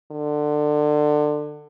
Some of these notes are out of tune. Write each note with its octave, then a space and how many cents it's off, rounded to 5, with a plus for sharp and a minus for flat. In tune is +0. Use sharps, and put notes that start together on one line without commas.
D3 +20